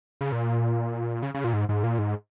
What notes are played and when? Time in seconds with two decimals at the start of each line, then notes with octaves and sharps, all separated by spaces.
0.21 C#3
0.32 A#2
1.23 C#3
1.34 C#3
1.44 A#2
1.53 G#2
1.69 G#2
1.83 A#2
1.98 G#2